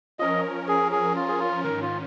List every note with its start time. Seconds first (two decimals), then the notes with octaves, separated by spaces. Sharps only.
0.19 F3 C#4 A#4 D#5
0.68 G#4
0.92 G#4
1.16 F4
1.28 G#4
1.39 F4
1.64 G#2 D#3 C#4 A#4
1.82 F4